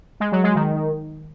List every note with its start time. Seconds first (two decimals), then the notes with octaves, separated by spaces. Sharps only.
0.20 G#3
0.32 F#3
0.44 G#3
0.55 D#3